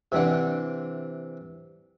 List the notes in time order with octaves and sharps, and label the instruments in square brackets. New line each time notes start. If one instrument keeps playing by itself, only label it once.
[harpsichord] C3 E3 C4 D4 F#5